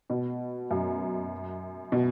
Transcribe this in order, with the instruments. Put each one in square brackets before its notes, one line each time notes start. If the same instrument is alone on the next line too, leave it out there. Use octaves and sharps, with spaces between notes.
[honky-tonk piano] B2
F#2
B2